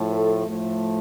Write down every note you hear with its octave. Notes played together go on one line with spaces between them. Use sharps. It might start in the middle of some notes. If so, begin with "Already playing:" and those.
Already playing: A2 F3 A3
A4
A2 F3 A3